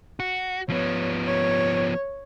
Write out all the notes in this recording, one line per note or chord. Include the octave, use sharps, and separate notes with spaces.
F#4
F3 B3 C#5
C#5